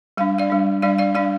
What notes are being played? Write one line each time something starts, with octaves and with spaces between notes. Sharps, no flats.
G3 D4 F5
D5 F5
G3 D4
G3 D4 D5 F5
D5 F5
G3 D4 D5 F5